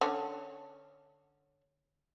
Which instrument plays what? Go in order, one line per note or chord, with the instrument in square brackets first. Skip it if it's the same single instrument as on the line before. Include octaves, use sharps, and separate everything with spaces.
[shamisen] D3 C#4